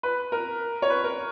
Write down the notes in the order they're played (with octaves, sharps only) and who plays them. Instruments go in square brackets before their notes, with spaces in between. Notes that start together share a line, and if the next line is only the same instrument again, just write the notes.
[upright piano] B4
A#4
C#5
B4
A#4